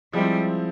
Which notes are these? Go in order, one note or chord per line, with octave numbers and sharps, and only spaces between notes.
F3 G3 G#3 C4 E4